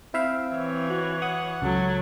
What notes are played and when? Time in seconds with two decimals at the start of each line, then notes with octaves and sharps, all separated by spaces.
0.14 C4 E4 E5 F5
0.54 E3 C#5
0.90 F#4
1.22 F#5 D#6
1.62 C#2 F#3 A4